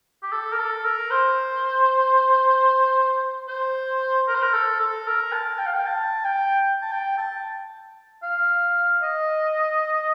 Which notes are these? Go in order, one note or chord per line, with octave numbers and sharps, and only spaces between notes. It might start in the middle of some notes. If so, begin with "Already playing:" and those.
G4
A4
A#4
A4
A#4
C5
C5
A#4
C5
A#4
A4
A4
A#4
A5
G5
F5
G5
A5
G5
A5
G5
A5
F5
D#5